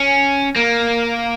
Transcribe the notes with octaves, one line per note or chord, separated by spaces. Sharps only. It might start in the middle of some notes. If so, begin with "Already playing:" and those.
Already playing: C#4
A#3